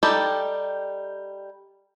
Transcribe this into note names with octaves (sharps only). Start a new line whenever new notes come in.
G3 D#4 G4 A4